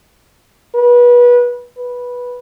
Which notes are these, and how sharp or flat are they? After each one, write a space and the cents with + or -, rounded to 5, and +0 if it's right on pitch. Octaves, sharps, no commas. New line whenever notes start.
B4 -25
B4 -10